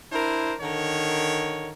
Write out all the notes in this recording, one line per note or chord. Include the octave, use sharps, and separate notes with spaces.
D4 E4 A#4 C5
D3 D#3 A#4 C#5